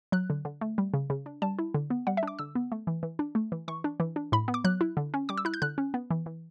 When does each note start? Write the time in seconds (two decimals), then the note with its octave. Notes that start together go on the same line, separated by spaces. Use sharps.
0.12 F#3 F#6
0.30 D3
0.45 D3
0.61 A3
0.78 G3
0.94 C#3
1.10 C#3
1.26 D4
1.42 G3 A5
1.59 E4
1.74 D3
1.90 B3
2.07 G3 F#5
2.17 E5
2.23 D4 D6
2.39 D3 E6
2.55 B3
2.72 A3
2.87 E3
3.03 E3
3.19 D4
3.35 A3
3.52 E3
3.68 E3 C#6
3.84 D4
4.00 E3
4.16 D4
4.32 A2 B5
4.48 B3
4.54 D6
4.64 F#3 F#6
4.81 E4
4.97 D3
5.14 C#4
5.29 G3 D6
5.38 E6
5.45 E4 F#6
5.54 G6
5.62 D3 F#6
5.78 C#4
5.94 B3
6.10 E3
6.26 E3